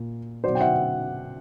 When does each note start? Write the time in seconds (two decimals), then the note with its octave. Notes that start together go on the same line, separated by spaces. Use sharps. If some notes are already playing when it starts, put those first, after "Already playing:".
Already playing: A#2
0.44 B2 F#3 C5 D5
0.55 G5
0.61 E5 F#5